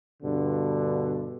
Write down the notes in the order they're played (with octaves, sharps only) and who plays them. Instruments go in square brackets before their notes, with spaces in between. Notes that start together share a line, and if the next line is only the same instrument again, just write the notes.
[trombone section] G2 B2 D3